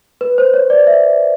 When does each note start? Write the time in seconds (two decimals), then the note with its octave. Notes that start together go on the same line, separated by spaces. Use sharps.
0.21 B4
0.38 C5
0.54 C#5
0.70 D5
0.87 E5